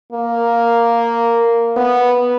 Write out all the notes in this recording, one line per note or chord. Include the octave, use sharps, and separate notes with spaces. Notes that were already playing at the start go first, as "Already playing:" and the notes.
A#3
B3